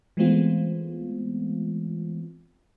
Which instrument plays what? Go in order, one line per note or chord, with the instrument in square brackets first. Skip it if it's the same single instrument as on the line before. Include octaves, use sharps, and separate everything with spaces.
[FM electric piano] E3 G#3 A3 B3 C4 F4